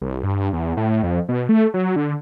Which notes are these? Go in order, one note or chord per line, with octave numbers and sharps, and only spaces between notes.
C2
G2
E2
A2
F2
B2
A3
F#3
D3